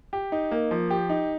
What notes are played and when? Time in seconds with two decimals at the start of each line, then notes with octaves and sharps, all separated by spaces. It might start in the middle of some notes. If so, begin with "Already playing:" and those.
0.13 G4
0.32 D#4
0.51 A#3
0.71 F3
0.90 G4
1.10 D#4